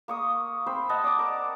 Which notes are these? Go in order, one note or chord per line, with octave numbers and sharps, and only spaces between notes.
A#3 C#6 D#6
C4 C5 B5
D#5 F#5 A5
D5 D6
A#4